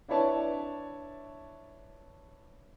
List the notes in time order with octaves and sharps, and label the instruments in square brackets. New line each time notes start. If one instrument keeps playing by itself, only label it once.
[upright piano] D4 E4 B4 C#5 D5 A5